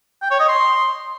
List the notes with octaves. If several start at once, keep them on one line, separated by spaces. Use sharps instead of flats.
G5
C#5
D#5
C6